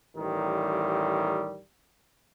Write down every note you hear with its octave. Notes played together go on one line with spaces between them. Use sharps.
A1 D#3 G3